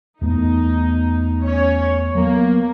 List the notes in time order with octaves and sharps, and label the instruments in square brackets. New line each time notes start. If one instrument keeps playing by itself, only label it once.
[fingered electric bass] E2 A3 B3 [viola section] D#4
[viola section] C#4 C#5
[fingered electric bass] F#3 B3 [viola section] A#3